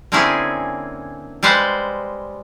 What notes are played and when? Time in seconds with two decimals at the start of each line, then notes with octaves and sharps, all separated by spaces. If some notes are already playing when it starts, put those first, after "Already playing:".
0.12 D3 A#3 C4 C#4 E4 G#4
1.43 G3 G#3 B4 C5 F5